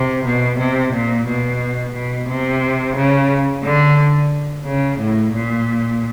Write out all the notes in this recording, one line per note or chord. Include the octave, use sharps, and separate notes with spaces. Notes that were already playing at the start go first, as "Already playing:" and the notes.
Already playing: C3
B2
C3
A#2
B2
B2
C3
C#3
D3
C#3
A2
A#2